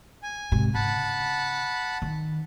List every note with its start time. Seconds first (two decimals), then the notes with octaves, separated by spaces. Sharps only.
0.23 G#5
0.52 G#2 C3
0.75 C#3 F#5 A5 B5
2.02 D#3